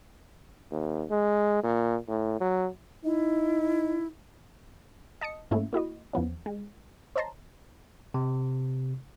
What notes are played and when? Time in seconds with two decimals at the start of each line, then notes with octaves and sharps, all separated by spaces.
0.71 D#2
1.10 G#3
1.63 A#2
2.08 A2
2.40 F#3
3.05 D#4 E4
5.21 D#5 A5 D#6 C#7
5.51 G#2 A3 A#3 C#4 E4
5.73 A#3 E4 F#4 D#5
6.13 E2 F3 B3 C#4
6.46 G#3
7.16 C5 C#5 D#5 A5 A#5 C6
8.14 C3